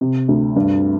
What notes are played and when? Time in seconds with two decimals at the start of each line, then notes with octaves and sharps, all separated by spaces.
0.01 C3
0.28 D2
0.56 G2